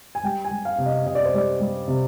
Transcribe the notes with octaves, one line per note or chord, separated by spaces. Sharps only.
G#5
G3 G5
G#5
G3
F5
C3
D#5
C3 D#5
D5
C5
G3 D5
G3
C3